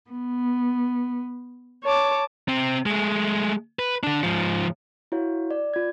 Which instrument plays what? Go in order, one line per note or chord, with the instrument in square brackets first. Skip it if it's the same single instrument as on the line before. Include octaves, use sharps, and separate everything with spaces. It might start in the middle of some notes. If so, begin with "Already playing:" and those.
[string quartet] B3
C#5 A5 D6
[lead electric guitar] C3 C4
G#3 A3
B4
D3 D4
G#2 F3
[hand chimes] E4 F#4 C#5 F5
D5
F4 G#6